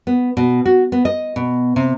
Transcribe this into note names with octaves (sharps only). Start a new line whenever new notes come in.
B3
B2
F#4
B3
D#5
B2
C3